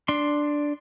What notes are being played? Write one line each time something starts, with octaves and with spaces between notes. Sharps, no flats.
D4 C6